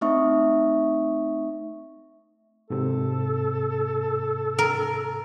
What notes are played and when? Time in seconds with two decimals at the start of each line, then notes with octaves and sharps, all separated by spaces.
0.01 A3 C4 D#4 E5 C#6 D#6
2.70 G#2 C3 A4
4.59 A#4